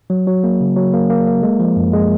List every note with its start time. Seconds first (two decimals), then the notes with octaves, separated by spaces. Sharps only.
0.10 F#3
0.27 F#3
0.44 A#3
0.61 C#3
0.76 F#3
0.94 A#3
1.10 A#3
1.27 A#3
1.43 G#3
1.60 F3
1.76 F#2
1.93 G#3